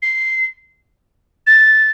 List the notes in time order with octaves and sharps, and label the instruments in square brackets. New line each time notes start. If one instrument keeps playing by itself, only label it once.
[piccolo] C7
A6